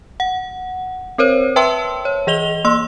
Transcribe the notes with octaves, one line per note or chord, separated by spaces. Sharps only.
F#5
C4 A#4 C5 C#5
B4 E5 G5 A5 C6 E6
C#5
E3 G#4 D#5 F7 G7
A#3 C6 E6